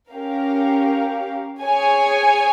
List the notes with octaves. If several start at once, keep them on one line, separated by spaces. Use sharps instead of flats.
C#4 G4 A#4 F5
G#4 C#5 G#5